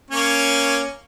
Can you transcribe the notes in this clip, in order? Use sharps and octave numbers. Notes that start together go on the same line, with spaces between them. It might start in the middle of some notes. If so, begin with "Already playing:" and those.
A#3 C#4 C#5